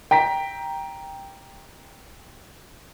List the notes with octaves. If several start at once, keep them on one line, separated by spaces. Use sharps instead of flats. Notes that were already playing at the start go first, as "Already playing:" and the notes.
G5 A#5 B6